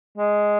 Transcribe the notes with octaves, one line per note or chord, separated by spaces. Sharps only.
G#3